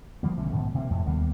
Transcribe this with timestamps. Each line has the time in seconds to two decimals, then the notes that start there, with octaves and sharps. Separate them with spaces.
0.23 F3 G3 A#3
0.37 B1 D3 A3 C#4
0.52 G#2 B2 D#3 F3
0.75 C3 A#3
0.90 F2 A2
1.06 D#2 G3 A#3 B3